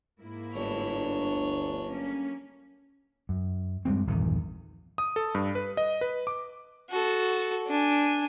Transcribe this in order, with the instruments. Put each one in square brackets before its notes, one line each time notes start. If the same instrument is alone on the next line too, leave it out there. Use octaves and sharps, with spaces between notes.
[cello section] G#2 A#3 E4
[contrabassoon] G1 [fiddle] D4 C#5
[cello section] D2
F#3 A#3 C#4
[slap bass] F#2
G2 G3 G#3 C4
A#1 E2 G2 D#3
[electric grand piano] D#6
A4
G2
B4
D#5
B4
D6
[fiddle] F#4 A4
D4 G#5